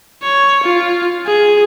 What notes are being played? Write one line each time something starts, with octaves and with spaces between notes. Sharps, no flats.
C#5
F4
G#4